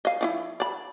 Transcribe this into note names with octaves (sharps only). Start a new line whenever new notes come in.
D#5 F5
F3 D#4 E4
D5 B5